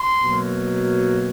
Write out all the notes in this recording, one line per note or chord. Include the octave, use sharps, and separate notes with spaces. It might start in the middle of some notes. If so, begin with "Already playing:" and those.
Already playing: C6
B2 F#3 A#3